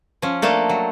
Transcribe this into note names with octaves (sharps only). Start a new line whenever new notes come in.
F3 C#4
A3 A#3 D4 A4
F#3